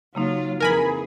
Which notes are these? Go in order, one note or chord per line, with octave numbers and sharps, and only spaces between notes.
C#3 F#3 A#3 D#4 F4
F2 E3 G#4 A#4 G#5 B5